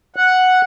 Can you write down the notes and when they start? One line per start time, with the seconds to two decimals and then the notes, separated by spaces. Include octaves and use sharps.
0.16 F#5